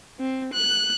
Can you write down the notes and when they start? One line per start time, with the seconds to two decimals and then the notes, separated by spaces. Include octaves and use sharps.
0.20 C4
0.53 F#6